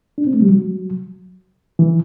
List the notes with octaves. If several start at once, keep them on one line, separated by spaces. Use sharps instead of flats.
D4
C4
A3
G3
F#3
E3